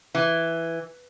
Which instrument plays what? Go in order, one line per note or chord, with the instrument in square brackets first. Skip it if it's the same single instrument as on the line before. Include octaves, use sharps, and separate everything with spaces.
[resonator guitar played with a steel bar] E3